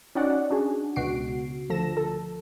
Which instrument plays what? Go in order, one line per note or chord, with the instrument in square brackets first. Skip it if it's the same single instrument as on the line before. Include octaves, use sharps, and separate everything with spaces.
[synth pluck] C#4 D#4 F#4 D5 F#5
D4 F#4 G#4
C#2 B2 F#4 C7 D7
D2 F3 A4 A#6 E7
A4